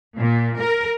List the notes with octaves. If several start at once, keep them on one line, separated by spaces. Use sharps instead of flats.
A#2
A#4